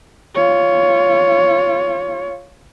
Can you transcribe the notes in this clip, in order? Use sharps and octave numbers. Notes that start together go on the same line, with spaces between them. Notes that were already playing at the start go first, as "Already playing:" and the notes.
F4 C#5